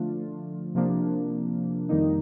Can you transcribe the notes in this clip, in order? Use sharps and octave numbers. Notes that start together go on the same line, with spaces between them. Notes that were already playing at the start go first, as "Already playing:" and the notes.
Already playing: D3 F3 A3 D4 F4
C3 F3 A#3 D4
F2 D#3 G3 A#3 D#4